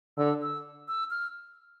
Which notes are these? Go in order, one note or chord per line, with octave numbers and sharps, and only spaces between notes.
D3 E6
E6
E6
F6